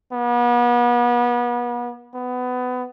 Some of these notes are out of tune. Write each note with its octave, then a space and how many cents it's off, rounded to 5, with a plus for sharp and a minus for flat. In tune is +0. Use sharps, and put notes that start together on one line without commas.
B3 -35
B3 +20